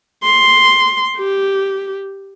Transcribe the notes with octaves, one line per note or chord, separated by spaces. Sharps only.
C6
G4